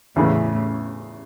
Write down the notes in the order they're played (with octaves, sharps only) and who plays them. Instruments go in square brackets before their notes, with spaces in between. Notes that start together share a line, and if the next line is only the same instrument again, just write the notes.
[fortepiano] E2 C#3 E3 A3 [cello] A2